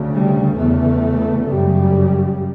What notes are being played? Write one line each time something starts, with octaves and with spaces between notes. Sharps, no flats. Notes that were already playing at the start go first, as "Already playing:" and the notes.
Already playing: D2 C#3
G3
E2 C#3 A3
F#2 C#3 G3